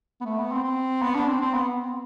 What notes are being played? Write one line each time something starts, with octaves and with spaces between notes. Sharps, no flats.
B3
A3
B3
C4
C4
B3
D4
C4
C4
B3
C4
B3